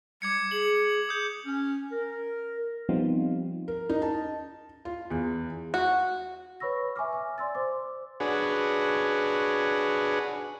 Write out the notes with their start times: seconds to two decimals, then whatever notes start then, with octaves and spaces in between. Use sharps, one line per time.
0.22 G3 D6 G#6 C#7
0.51 G#4 F#7
1.09 D#6 G6
1.46 C#4
1.92 A#4
2.89 F3 G3 B3 C4 D#4 F4
3.68 A#4
3.89 D#4
4.02 A5
4.85 F4
5.10 E2
5.74 F#4
6.60 B4 C#5 B5 C#6 E6 A#6
6.96 E5 G#5 C#6 D6 F6
7.13 G#5 D6
7.38 D5 C6 E6 A6
7.55 C5 D6
8.20 D4 F#4 G#4 B4 C#5